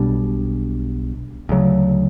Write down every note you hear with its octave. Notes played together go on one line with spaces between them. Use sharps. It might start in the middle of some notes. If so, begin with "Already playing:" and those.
Already playing: B1 B2 G3 D4
D2 C#3 F#3